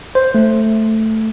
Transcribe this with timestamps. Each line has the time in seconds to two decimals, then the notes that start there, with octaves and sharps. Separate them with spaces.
0.15 C5
0.35 A3